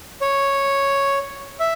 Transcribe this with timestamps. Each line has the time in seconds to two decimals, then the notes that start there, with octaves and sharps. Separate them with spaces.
0.21 C#5
1.60 E5